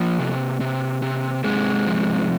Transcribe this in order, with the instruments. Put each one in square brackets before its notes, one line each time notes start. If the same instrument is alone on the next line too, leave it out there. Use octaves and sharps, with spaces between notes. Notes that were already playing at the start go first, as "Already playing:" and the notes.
Already playing: [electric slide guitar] F3 A#3
C3
C3
C3
G#2 C3 G#3
F3